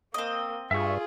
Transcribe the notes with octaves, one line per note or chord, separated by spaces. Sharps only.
A#3 C4 D#5
G2 F4 G#4 E5 C#6